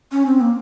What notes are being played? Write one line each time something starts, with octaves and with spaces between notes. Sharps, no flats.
C#4
C4
A#3